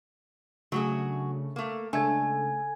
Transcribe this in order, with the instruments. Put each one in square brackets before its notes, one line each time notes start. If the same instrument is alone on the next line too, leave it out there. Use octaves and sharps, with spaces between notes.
[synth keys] C#3 A3 D4 [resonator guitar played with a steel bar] F#3 F#4 G#4
[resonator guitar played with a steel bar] A3 A#3
[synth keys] C#3 G#3 [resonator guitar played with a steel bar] A3 [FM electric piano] D4 A4 [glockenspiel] G#5 G#6